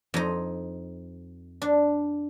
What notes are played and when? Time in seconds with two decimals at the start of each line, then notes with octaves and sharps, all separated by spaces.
0.14 F2 D#4
1.62 D4